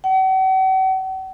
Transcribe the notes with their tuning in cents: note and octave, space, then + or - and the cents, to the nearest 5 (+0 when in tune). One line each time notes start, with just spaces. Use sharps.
F#5 +45